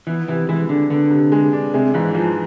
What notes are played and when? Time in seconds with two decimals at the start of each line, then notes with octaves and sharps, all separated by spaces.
0.07 E3 B3
0.28 C3 E3
0.49 E3 G#3
0.69 D3 D4
0.90 D3 B3
1.11 C3
1.32 G#3
1.53 D4
1.74 C3 G#3
1.94 G#2 E3
2.14 E3 F3